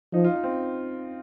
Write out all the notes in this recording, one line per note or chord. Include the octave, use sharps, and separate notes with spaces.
F3 D#4
F4
D#4
C4